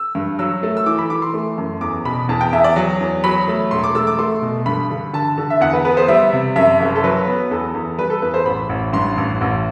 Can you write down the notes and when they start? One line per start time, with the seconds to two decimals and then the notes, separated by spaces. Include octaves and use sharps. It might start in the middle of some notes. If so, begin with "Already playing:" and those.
Already playing: E6
0.15 G2
0.39 F#3 E6
0.63 A3
0.77 E6
0.86 E3 D6
0.98 B5
1.10 E3 D6
1.22 C6
1.34 A3
1.58 F#2
1.81 E2 D6
2.05 B2 B5
2.29 E2 A5
2.41 G5
2.52 E2 E5
2.64 D5
2.76 F#3
3.00 E2
3.24 F#3 B5
3.48 A3
3.71 E1 C6
3.84 D6
3.95 A3 E6
4.07 D6
4.19 A3 C6
4.42 B2
4.66 G2 B5
4.90 D3
5.13 D3 A5
5.38 D3
5.50 E5
5.61 E2 F#5
5.73 B4
5.85 B3 B4
5.97 C5
6.08 G3 E5
6.32 C3
6.56 F#2 E5
6.80 F#1
6.95 A4
7.04 F#3 B4
7.27 B3
7.51 E2 A4
7.74 E2
7.99 G3 B4
8.10 A4
8.22 E2 B4
8.34 C5
8.46 A1 B5
8.69 A1
8.93 G2 C6
9.18 A1
9.41 A1